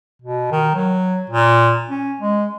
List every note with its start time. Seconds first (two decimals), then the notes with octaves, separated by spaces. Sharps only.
0.22 B2
0.52 D#3
0.75 F#3
1.30 A#2
1.90 C#4
2.21 G#3